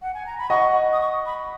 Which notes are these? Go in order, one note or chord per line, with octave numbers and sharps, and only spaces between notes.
F#5
G#5
A#5
B5
D#5 F#5 C#6
D#6
C#6
B5